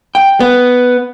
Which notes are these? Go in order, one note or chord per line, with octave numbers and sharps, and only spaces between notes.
G5
B3